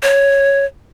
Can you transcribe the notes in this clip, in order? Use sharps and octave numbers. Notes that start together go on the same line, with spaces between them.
C#5